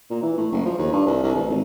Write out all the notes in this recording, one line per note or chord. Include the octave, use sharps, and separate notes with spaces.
A#2
E3
A2
F#1
F3
D#2
G2
C2
C2
A1
G#1